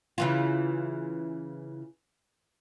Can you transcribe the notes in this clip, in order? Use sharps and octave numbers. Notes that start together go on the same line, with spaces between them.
C#3 E3 F4